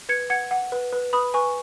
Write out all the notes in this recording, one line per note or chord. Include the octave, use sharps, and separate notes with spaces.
B4 G#6 C#7
F#5 G#6 C#7
F#5
B4
B4
B4 B5 D#6
B4 G#5 C#6